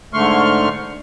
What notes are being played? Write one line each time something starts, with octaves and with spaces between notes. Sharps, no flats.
G#2 D3 A3 C6 C#6 F6